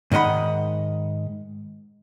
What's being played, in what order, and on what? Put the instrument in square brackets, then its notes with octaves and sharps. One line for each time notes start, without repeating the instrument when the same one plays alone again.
[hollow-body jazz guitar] G#2 D#3 D#5 F#5 B5